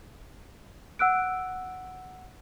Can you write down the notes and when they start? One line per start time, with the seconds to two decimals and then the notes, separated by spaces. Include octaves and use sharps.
0.99 F#5 E6 F#6 D7